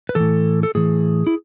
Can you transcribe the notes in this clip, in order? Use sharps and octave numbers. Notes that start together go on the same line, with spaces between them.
B4
A2 E3 A4
A4
A2 E3 G#4
E4